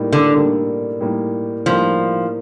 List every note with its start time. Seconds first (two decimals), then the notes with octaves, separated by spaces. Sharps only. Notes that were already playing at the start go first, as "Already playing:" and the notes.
Already playing: A2 G3 A#3 D#4
0.13 D3
0.34 A2 G3 A#3 D#4
1.00 A2 G3 A#3 D#4
1.66 A2 F3 G3 A#3 D#4